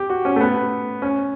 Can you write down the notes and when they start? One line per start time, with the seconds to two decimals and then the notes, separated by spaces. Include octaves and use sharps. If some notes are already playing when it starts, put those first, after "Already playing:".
Already playing: G4
0.10 F#4
0.25 C#4
0.36 A3
0.41 B3
1.02 C#4